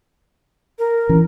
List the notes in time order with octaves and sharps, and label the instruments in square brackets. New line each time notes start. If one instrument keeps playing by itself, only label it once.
[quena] A#4
[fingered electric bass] E3 C#4